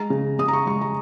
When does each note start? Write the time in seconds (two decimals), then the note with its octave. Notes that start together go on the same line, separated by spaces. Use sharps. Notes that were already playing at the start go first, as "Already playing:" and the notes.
Already playing: G#3 A#5
0.10 C#3
0.39 C#3 D#6
0.48 A#5
0.53 C#6
0.67 G#3 C#6
0.81 A#5